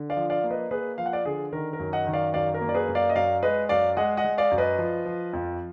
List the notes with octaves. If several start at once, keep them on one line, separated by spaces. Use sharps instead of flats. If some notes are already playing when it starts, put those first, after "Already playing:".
Already playing: D3
D5 F5
F3
D5 F5
A#3
B4 D#5
A#3 G#4 B4
F3 F5
F#5
D5 F5
D3 G#4
D#3 A#4
A#4
F#2
D#5 F#5
D#3
D5 F5
F#2 D5 F5
A#4
A#3
D5
G#4 B4
F#2
D5 F5
D#5
F#2 D5 F5
G#3 B4 D#5
F#2 D5 F5
G#3 D#5 F#5
D#5 F#5
G#3
D5 F5
F#2
B4 D#5
F3
F3
F2